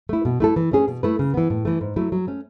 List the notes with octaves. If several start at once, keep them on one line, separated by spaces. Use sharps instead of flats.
A3 E4
B2
A3 E4 A4
E3
A3 C#4 G#4
B2
A3 E4 B4
C#3
E3 B3
A2
E3 A3
G#2
F#3 A3 E4
F#3
A3 C#4